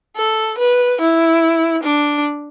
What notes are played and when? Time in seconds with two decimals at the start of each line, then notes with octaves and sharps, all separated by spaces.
0.17 A4
0.58 B4
1.01 E4
1.83 D4